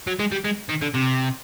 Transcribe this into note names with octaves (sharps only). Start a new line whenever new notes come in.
F#3
G#3
G3
G#3
D#3
D3
C3